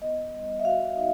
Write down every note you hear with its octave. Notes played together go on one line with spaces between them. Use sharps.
B3 D#5
G3
E5
F#4 F5
D#4